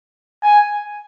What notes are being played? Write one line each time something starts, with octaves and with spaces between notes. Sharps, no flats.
G#5